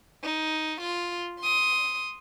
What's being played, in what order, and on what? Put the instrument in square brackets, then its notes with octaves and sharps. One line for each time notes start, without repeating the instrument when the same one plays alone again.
[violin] D#4
F4
C6 D#6